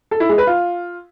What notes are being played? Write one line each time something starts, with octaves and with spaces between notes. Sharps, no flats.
A4
E4
G#3
B4
F4